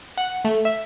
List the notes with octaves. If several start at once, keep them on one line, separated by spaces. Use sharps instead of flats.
F#5
A3
E5